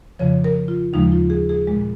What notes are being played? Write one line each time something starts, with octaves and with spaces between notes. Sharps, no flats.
F2 C#3 F3 C#5
A#4
F4
D#2 C#3 F3 G#3 D#4
F4
G#4
G#4
A#2 G#3